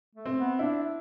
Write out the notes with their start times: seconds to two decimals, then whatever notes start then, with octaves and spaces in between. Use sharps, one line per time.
0.15 A3
0.26 C4
0.38 B3
0.59 D4 E4